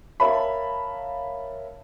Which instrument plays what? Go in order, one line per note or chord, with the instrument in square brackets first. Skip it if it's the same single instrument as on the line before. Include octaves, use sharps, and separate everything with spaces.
[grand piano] A#4 C#5 E5 F5 A5 B5